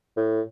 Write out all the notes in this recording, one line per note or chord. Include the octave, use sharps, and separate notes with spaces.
A2